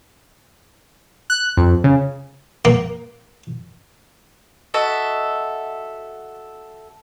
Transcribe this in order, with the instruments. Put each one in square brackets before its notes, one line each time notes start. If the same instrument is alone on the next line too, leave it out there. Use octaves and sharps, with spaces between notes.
[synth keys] F#6
F2
C#3
[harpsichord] A#3
[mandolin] F#4 A4 D#5 E5